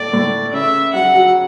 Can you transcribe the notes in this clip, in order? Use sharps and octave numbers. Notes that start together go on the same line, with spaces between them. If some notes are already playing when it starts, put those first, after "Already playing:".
Already playing: A2 A3 D5
A2 A3
C#3 C#4 E5
F#3 F#4 F#5
F#3 F#4